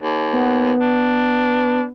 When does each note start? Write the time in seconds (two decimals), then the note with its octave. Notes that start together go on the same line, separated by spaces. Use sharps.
0.03 D#2
0.33 B3
0.80 D4